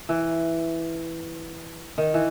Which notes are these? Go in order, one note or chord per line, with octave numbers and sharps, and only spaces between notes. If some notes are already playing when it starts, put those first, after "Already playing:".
E3
D#3
E3